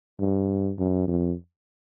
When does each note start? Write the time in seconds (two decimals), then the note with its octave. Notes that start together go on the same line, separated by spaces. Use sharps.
0.20 G2
0.79 F#2
1.08 F2